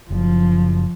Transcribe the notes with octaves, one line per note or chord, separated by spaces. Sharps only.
F#1 F3